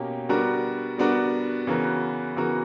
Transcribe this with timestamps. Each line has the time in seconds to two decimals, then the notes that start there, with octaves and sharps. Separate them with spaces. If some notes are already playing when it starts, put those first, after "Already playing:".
Already playing: B2 A#3 C#4 G4
0.29 G3 B3 D4 F#4 A#4
0.98 G3 B3 D4 F#4 A#4
1.67 C#3 E3 B3 F#4 A#4
2.36 C#3 E3 B3 F#4 A#4